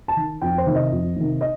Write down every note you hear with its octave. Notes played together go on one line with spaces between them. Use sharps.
A5
D#3
F2 G5
C5
C3 D#3
D#5
F2
C3 D#3
D#5